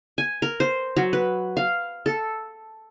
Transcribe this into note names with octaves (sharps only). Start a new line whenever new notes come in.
G#5
A#4
C5
F#3
B4
F5
A4